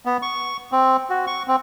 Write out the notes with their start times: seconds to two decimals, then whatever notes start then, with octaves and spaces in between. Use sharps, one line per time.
0.05 B3
0.22 C#6
0.72 C4
1.10 F#4
1.27 C#6
1.48 C4